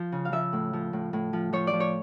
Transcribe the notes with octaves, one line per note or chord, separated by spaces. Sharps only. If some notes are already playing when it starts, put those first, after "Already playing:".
Already playing: F3
C#3
F5
F3 E5
A2
F3
A2
A2
F3
F3 C#5
D5
F3
C#5